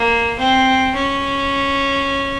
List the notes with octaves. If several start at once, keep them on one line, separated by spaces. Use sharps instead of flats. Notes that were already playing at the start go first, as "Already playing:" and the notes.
Already playing: A#3
C4
C#4